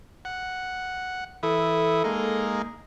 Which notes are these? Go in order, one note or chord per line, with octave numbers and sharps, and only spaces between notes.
F#5
E3 E4 A4 D#6
G#3 A#3 D#4